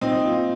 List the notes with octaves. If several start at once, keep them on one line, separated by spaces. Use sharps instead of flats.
A#2 C4 D#4
F4